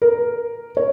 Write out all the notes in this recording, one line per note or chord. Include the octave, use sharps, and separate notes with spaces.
A#4
C#5